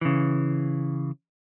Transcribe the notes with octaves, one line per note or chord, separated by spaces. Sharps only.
C#3 E3